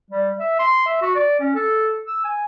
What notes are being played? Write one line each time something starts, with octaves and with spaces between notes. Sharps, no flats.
G3
E5
C6
E5
F#4
D5
C#4
A4
E6
G#5